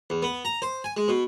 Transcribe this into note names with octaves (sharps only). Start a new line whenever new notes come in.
E2
B3
A#5
C5
G#5
G#3
B2